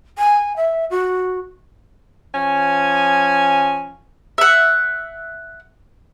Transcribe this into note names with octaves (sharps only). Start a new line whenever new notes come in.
G#5
E5
F#4
F3 C#4 G#5
E5 F#5